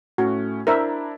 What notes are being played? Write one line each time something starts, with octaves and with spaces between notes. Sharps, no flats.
A2 A3 C#4 F#4
D4 E4 A#4 C5 E5 A#5